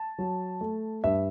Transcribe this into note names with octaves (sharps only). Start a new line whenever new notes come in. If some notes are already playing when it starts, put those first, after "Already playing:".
Already playing: A5
F#3
A3
G2 E5